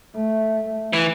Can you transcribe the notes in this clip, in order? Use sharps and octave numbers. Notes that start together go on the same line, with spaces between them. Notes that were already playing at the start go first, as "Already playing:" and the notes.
A3
E3